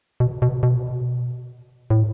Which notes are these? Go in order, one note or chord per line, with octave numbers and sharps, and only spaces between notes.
B2
B2
B2
A2